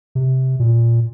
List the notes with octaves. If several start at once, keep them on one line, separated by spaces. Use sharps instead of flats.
C3
A#2